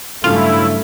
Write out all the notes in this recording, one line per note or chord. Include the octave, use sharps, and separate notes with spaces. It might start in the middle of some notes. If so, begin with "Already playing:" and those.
G2 C#3 F#3 A3 E4 F4 F5